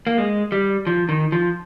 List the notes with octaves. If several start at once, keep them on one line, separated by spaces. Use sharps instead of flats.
A#3
G#3
G3
F3
D#3
F3